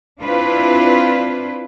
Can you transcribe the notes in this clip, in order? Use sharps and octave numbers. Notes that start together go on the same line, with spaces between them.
C4 D4 E4 F4 B4